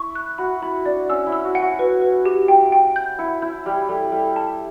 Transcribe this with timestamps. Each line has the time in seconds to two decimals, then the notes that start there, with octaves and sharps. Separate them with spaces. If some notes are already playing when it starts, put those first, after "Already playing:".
Already playing: E4 C#6
0.15 F#6
0.38 F#4 B5
0.62 E4 B5
0.85 D4 D5
1.09 C#4 E6
1.27 E4
1.32 E6
1.45 F#4
1.55 F#5
1.62 F#4
1.79 B4
2.02 B4
2.25 G4
2.48 G5
2.72 G5
2.96 G6
3.19 E4 F#5
3.42 E4 G6
3.65 G3 B5
3.89 G3 A4
4.12 G3 A4
4.36 A5